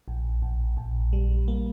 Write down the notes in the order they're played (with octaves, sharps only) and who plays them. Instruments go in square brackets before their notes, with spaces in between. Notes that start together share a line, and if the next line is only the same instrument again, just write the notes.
[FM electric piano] A#1
A#1
A#1
G3
A#3